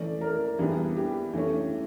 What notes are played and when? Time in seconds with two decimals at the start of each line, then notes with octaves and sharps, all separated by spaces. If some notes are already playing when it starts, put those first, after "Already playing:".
Already playing: E3 A3 C#4 D5
0.21 A#4
0.59 E3 G3 B3 D4 G#4
0.97 G4
1.33 E3 A3 C#4